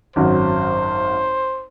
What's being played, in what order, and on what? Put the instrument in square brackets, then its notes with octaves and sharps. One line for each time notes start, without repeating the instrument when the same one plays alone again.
[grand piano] G#1 F#2 F#4 [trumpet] C5